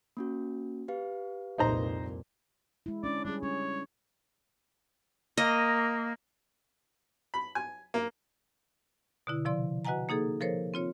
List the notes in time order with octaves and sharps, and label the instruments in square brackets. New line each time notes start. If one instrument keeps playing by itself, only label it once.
[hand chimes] A#3 C#4 F#4
G4 B4 F5
[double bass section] C2 F2 A#2 [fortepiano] D#4 C5 A#5
[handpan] G#3 E4
[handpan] G#3 C#4 D4 [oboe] D5
[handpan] G3 C#4 G#4 [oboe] D4
[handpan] C#4 D4 [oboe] C#5
[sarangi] A#3 [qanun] D#5
[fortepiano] B5
G#5
A#3
[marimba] B2 D3 E4
C3 F3 D5 C6
F#4 B4 D#5 F#5 G#5 A#5
A#3 D#4 G#4 A4
F3 A4 A#4 C5 C#5
C4 F4 C#5